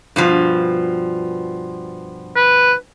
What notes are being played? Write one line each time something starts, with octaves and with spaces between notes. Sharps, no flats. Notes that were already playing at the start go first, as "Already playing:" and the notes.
G2 B2 F3
B4